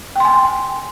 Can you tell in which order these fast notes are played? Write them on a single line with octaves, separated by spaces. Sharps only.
G5 C6 G#5